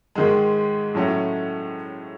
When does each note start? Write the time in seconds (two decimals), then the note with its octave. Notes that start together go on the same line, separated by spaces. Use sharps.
0.15 G#2 D#3 G#3
0.95 A2 F#3 A3 C#4 E4